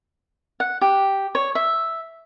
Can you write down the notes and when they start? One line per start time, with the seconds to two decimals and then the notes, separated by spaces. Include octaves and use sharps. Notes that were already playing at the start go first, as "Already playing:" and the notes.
0.60 F#5
0.81 G4
1.35 C#5
1.55 E5